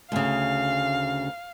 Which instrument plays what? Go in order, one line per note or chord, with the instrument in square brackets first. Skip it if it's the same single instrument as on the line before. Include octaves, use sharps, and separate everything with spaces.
[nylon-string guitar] D2 C#3 [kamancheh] F5